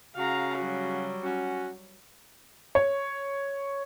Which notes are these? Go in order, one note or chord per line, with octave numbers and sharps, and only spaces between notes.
C#3 F#4 F5 A#5
F#3 G3
C#4 F#4
C#5